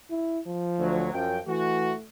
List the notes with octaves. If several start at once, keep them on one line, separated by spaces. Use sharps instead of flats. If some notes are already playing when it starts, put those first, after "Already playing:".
E4
F3
D2 F#3
F#2 F3 G5
E3 A3 F#4